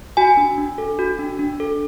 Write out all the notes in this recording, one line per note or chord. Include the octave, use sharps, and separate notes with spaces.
F#4 G#5
D4
D4
A4
F#4
D4
D4
A4